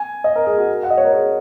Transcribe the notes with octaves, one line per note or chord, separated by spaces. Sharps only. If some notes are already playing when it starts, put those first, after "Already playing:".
Already playing: G#5
D#5
A#4
G#4
F#4
F#5
D#5
C#5
A#4
G#4